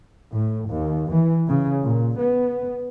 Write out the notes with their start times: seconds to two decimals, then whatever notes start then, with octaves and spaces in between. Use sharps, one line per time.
0.34 A2
0.70 D#2
1.12 E3
1.48 C#3
1.82 A#2
2.18 B3